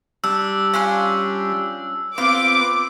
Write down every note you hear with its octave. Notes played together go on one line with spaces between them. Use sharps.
G3 D4 E6
C#4 D4 F4
B3 C4 F4 D6